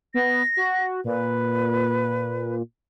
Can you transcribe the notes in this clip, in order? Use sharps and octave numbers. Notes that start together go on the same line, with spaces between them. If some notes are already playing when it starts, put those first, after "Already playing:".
B3 A#6
F#4
A#2 B4